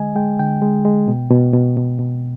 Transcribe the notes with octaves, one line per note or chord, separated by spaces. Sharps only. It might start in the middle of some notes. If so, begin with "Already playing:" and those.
Already playing: D3 G#3 D#5 G#5
G#3 G5
D3 G5
G#3
G#3
B2
B2
B2
B2
B2